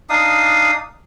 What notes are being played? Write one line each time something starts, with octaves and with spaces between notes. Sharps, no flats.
D4 D#4 F5 D#6